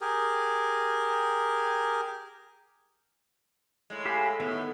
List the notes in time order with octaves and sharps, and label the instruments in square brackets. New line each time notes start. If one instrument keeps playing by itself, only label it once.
[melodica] G4 G#4 A#4
[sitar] A2 G#3
[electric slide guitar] G4 G#5 [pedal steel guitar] E5 F5 B5
[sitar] A2 [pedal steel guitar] D#3 B3 E4 [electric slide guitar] E5